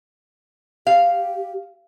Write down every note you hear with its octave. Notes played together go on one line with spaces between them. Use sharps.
G4 F5